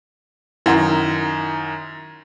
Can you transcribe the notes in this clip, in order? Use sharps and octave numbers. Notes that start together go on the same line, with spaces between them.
F#2 D#3 E4 F#5 C6